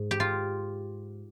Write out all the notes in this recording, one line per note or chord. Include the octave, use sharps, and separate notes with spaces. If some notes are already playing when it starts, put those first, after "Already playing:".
Already playing: G#2
G4
F4